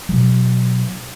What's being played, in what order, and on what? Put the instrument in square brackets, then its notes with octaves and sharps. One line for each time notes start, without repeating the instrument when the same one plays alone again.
[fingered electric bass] B2 F#3